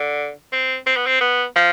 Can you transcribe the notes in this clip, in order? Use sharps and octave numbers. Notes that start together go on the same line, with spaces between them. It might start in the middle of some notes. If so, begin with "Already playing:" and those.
Already playing: D3
C4
C4
B3
C4
B3
F3